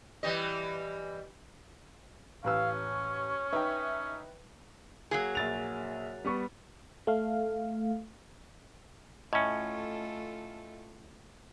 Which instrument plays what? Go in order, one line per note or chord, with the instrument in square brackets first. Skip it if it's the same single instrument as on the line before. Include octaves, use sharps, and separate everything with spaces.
[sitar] E3 G3 D#5
[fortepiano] A1 B4 E6 [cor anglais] C#4 [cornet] F5
[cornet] C#5
[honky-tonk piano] D#4 E5 [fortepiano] B4 G5
[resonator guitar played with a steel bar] F#3 A#3 G#4
[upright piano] A#1 A6 F7
G3 B3 C#6
[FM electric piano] A3 F5
[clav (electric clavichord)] A2 C#4 [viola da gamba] A3 F4 A4 [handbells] D#5 G#5